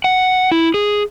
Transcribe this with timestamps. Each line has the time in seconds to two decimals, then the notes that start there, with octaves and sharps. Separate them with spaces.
0.04 F#5
0.52 E4
0.74 G#4